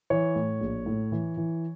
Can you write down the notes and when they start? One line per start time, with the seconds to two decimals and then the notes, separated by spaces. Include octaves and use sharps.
0.10 E3 C#5
0.36 A2
0.60 A#1
0.86 A2
1.12 E3
1.37 E3